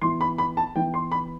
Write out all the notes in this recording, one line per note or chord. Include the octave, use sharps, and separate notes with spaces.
E3 B3 E4 C6
B5
B5
A5
E3 B3 E4 G5
C6
B5